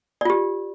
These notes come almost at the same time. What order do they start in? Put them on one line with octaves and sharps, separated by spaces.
D5 F4 G4